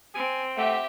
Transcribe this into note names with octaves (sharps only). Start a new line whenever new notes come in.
C4 G#5
A3 G4 E5 F#5